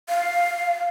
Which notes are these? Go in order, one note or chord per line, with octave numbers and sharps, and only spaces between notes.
F5